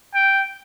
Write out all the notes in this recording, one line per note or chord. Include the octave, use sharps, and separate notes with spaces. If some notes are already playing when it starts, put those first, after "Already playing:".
G5